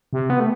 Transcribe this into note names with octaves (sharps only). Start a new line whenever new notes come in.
C3
B3
A3